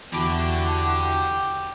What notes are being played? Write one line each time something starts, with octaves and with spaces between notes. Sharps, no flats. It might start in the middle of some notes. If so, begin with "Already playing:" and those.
E2 D3 E4 F#4 G4 A5 B5 D6